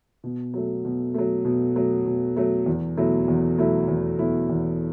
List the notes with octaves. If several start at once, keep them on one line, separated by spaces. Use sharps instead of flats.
B2
F#3 A3
B2
F#3 A3
B2
F#3 A3
B2
F#3 A3
E2
B2 F#3 A3 E4
E2
B2 F#3 A3 E4
E2
B2 F#3 A3 E4
E2